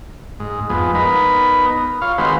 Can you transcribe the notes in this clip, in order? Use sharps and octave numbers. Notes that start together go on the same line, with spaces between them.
G#2
F2 G#3 B3
B3 D#4 A#4 B4
F4 C#5 F5
D#3 G#3 C4 F#4 B4 C5